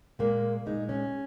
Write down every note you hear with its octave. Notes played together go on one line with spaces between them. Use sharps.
A#2 G#3 A#3
A#2 G#3 D#4
C#4